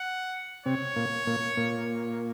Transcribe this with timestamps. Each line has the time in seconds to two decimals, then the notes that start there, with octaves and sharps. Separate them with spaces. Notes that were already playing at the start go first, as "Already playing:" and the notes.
Already playing: F#5
0.66 C3 C4 C#5
0.96 A#2 A#3
1.27 A#2 A#3
1.57 A#2 A#3